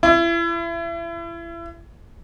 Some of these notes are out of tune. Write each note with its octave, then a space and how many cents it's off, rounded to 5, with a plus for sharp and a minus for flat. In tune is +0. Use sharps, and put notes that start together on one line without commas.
E4 +35